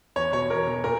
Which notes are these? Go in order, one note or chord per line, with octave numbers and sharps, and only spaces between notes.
E2 C#5
B2 C#5
E2 A#4
B2
A#2 A#4